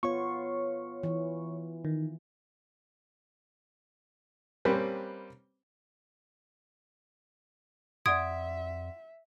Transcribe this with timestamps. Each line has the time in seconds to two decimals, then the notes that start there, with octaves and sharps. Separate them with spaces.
0.03 B3 F4 C#5 C#6
1.03 E3
1.85 D#3
4.65 G3 A#3 C4 C#4 B4 C5
8.06 F2 D5 E5 F#5 C6 D#6 G#6 D7